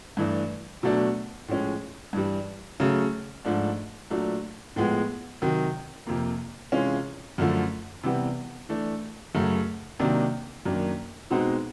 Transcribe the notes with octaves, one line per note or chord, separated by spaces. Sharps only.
G2 E3 A3 D4
B2 F#3 A3 D4
A2 F3 G#3 C#4
G2 E3 G3
C#3 F#3 A3
G#2 F3 A3 D4
A#2 F#3 A3 D4
A2 F3 G#3 B3
C3 D#3 F#3
F2 C3 F3 A#3
C3 E3 G#3 C#4 F4
F#2 D3 F3 A3
C3 E3 G3 B3
E3 A3 D4
F#2 C#3 F#3 A3
C3 D#3 F#3 A#3 D4
F#2 D#3 F#3 A#3 D4
B2 G#3 C4 D#4 F#4